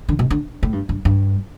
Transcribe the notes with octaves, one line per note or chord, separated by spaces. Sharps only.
D3
B2
D3
A2
G2
G2
G2